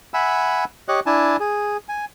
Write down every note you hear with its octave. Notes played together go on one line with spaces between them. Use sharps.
E5 F#5 G#5 B5 E6
G4 C#5 D#5 F#6
D4 E4 G#5 A5
G#4
G#5